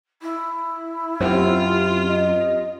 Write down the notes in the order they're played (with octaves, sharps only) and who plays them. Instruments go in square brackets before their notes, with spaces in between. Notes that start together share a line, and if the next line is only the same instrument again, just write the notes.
[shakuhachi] E4
[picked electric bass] F#2 [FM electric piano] C4 C#4 G4 [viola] F4
[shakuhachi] D#5